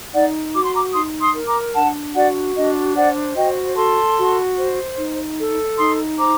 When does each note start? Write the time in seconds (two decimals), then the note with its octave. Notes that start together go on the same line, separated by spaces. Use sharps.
0.14 D#4 D5 F#5
0.54 F#4 D6
0.64 C6
0.75 A#5 D6
0.94 D#4 C6 D#6
1.21 C6 D#6
1.35 A#4
1.48 A#5 D6
1.75 D4 F#5 A5
2.15 F#4 D5 F#5
2.56 D4 D#5
2.96 C5 D5 F#5
3.36 F#4 D#5 G5
3.76 A4 A5 C6
4.18 F#4
4.58 C5
4.98 D#4
5.38 A4
5.79 D#4 C6 D#6
6.19 C5 A#5 D6